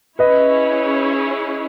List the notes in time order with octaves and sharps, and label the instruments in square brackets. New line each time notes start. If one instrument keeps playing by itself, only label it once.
[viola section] C#4 E4 G#4 C#5 [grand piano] B4 D#5